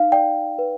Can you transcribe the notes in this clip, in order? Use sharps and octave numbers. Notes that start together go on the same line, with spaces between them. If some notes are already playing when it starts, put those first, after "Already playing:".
Already playing: D#4 F5
D5 G5
B4